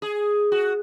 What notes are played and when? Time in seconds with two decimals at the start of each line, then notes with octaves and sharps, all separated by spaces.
0.02 G#4
0.52 F#4